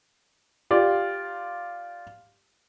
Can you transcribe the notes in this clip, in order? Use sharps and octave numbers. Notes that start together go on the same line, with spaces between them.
F4 G4 D5